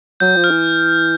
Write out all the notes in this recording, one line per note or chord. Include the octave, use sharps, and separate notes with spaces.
F#3 G6
F3
F6
E3